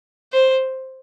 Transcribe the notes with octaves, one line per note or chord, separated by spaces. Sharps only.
C5